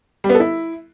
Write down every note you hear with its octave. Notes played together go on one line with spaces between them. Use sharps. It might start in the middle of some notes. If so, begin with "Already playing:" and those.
G3
B3
A4
E4